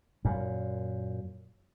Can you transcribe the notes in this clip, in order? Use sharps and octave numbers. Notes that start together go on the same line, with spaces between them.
F#2 A#2